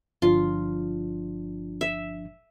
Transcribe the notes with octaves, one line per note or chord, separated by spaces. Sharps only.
G1 F3 D4 F4
E5